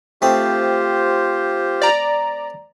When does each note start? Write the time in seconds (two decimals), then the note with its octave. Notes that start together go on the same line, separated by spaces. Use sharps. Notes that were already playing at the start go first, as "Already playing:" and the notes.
0.22 A3 C4 F4 G4 C5 D#6
1.82 D5 A#5